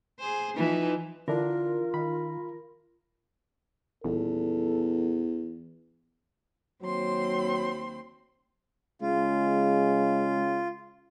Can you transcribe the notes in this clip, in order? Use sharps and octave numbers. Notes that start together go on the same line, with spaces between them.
G#4 C5
E3 F3 D#4
D3 E3 D4 E4 F4 A#4
D#3 B5
D#1 E2 A4
D#2 F#3 C4 C6
C#3 G#3 F4